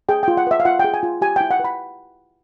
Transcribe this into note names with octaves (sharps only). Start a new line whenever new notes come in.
G#4 G5
F4 G5
F#5
B4 E5
F5
F4 F#5
G#4 G5
G#5
F4
G4 G#5
E4 G5
F#5
B4 B5